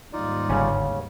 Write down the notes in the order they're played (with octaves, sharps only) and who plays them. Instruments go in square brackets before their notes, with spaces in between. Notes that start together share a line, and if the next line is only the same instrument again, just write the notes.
[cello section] D#2 G#2 G3 [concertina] D#4 F4 D5
[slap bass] G1 [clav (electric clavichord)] C#3 C#4